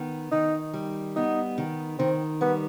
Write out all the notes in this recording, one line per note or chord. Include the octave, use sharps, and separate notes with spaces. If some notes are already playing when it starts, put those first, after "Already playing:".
Already playing: D#3 B3
D#3 D#4
G3
B3 D#4
D#3
D#3 C4
G3 B3